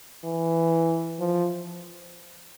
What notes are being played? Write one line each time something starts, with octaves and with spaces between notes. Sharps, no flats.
E3
F3